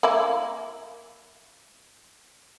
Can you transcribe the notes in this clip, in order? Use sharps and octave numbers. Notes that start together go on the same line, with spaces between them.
A#3 E4